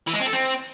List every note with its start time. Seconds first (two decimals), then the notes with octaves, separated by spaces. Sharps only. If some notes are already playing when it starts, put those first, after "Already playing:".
0.07 E3
0.14 G#3
0.20 C4
0.26 A4
0.33 C4